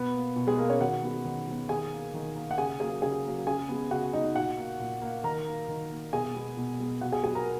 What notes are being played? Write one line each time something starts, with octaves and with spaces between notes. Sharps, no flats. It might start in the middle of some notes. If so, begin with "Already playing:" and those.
Already playing: B2 B3 B4
A#3
B2
G#3 G#4
A#3 A#4
C#4 C#5
D#3 F#4 F#5
G#3 B3
D#3
G#3 B3
D#3 G#4 G#5
A#3
D#3
A#3
F#5
C#3 G#4 G#5
F#3 A#3 G#4 G#5
C#3 G#4 G#5
F#3 A#3
C#3 G#4 G#5
G#3 B3
C#3 F#4 F#5
G#3 B3 D#4 D#5
A#2 F#4 F#5
A#3
A#2
A#3
D#3 A#4 A#5
A#3
D#3
A#3
B2 G#4 G#5
G#3 B3
B2
G#3 B3
B2 F#4 F#5
G#4 G#5
F#3 B3 G#4 G#5
A#4 A#5